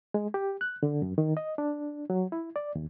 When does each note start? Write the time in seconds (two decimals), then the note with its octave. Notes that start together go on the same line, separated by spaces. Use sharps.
0.14 G#3
0.34 G4
0.61 F#6
0.83 D3
1.02 F#2
1.18 D#3
1.37 D#5
1.58 D4
2.10 F#3
2.32 E4
2.56 D5
2.75 D#2